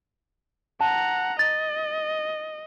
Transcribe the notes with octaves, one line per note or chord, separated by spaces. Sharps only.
F#5 A5 A#5
D#5 A6